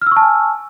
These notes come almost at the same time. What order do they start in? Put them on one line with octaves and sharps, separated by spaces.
F6 E6 C#6 A5 G#5